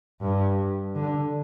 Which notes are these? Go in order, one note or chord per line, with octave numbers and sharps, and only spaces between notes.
G2
D3